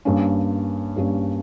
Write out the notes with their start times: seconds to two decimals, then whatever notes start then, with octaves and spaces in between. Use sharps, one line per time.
0.05 G2 G3 A#3 C#4
0.97 G2 G3 A#3 C#4